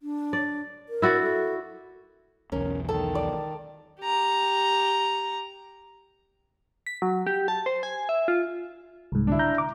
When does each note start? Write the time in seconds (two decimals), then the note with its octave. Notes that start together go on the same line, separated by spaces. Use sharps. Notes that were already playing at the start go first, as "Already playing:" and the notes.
0.02 D4
0.33 D5
0.89 A#4
1.02 E4 F#4 D5
1.22 A4
2.52 B1 E2 C#4 A#4
2.89 D#3 A4 A5
3.15 D5
4.01 G4 A#5
6.87 B6
7.02 F#3
7.27 G4
7.48 A5
7.66 C5
7.83 G#5
8.09 E5
8.28 F4
9.12 C2 G#2
9.27 D3 D4 E4
9.39 A#5 G6
9.58 D6